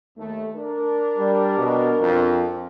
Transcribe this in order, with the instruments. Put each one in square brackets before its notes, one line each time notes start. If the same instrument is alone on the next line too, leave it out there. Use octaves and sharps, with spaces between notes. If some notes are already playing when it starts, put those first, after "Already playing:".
[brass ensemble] D#2 A3
D4 A#4
[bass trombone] G3
B2
F2